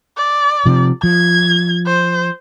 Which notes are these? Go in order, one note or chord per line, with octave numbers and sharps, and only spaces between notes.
D5
C3 F3
F3 G#6
C5